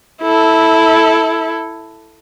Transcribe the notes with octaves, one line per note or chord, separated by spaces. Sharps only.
E4 A4